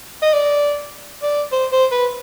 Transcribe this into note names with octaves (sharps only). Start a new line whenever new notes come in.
D#5
D5
D5
C5
C5
B4